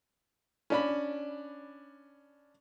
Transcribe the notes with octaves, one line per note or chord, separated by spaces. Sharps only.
C#4 D4 B5